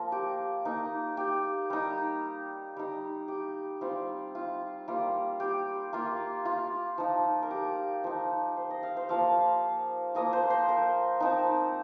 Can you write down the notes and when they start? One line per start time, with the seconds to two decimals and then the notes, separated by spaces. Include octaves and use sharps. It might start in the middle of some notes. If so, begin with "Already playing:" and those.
Already playing: F3 A#3 F4 A#4
0.12 G4
0.65 A#3 D#4
1.17 G4
1.70 G3 D#4
2.77 G3 D#4
3.28 G4
3.81 G3 C4 F4
4.35 F4
4.88 G3 A#3 F4
5.40 G4
5.93 A#3 F4
6.45 F4
6.98 F3 D#4
7.42 A#4
7.51 G4
8.04 F3 D#4
8.57 C5
8.71 D#5
8.83 F5
8.97 C5
9.09 F3 A#3 F4 F5
10.15 F3 A#3 F4 D#5
10.33 C5
10.50 C5
10.69 A#4
11.20 F3 C4 D#4